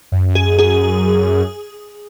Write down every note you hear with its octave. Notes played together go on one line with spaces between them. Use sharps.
F#2
G#4
G#4